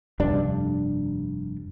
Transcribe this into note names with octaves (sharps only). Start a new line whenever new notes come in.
F1 G2 D4